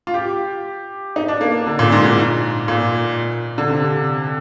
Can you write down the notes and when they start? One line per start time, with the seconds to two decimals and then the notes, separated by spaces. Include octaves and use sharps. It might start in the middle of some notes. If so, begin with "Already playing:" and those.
0.07 F4
0.14 G4
1.16 D#4
1.28 D4
1.41 A#3
1.66 D3
1.79 A#2
1.92 G#2
2.05 G#2
2.68 A#2
3.58 D3
3.70 C3